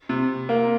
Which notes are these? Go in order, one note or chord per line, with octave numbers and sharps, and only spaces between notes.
C3
A#3